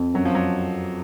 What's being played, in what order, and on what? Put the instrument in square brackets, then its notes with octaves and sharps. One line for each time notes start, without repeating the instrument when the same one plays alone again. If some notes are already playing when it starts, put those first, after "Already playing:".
Already playing: [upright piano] F2
[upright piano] F#2 [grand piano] F#3
[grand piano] F3
F#3